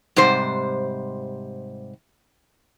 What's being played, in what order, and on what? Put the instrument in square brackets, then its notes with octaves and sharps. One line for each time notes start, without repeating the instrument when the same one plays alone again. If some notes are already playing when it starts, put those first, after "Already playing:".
[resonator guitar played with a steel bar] G#2 C3 G3 C5